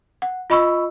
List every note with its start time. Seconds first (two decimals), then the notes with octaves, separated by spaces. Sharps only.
0.22 F#5
0.50 F4 D#5 B5 C#6 E6